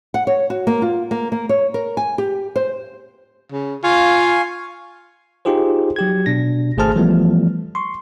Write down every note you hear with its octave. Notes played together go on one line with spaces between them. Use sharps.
F#5
C#5
F#4
A#3
F4
A#3
A#3
C#5
A#4
G#5
G4
C5
C#3
F4 F5 G#5 C#6
D#4 F4 G4 G#4 C5
F#3 G4 G#6
B2 D4 A#6
G#1 A3 G#4 C5 A5 F6
E3 F3 G3 A3 B3
C6 C#6